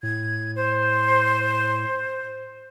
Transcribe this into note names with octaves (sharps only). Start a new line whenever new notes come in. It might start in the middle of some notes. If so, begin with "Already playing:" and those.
A2 G#6
C5